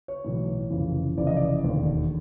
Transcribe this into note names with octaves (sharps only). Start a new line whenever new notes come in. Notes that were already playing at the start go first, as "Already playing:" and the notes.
C#5
B1 A2 E3
F1 F2 C#3 E3
F1 F2 C#3 E3 D5
D#5
D5
E1 D#2 D3